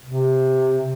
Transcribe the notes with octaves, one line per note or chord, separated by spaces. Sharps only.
C3